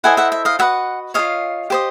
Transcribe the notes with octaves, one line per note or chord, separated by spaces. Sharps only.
E4 A4 C5 D#5 F#5 G#5
E5 F#5
E5
D#5 F5
F#4 B4 D#5 E5 F#5
F4 G#4 C#5 D#5 F5
G4 C5 D#5